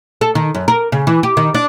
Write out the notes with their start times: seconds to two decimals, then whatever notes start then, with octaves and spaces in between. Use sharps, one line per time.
0.21 A4
0.35 D#3
0.55 F#2
0.68 A#4
0.92 C#3
1.07 E3
1.23 G4
1.37 D#3
1.54 D4